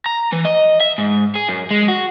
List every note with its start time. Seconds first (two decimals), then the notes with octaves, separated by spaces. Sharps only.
0.06 A#5
0.32 E3
0.45 D#5
0.80 E5
0.98 G#2
1.35 G#4
1.48 F#2
1.71 G#3
1.88 F#4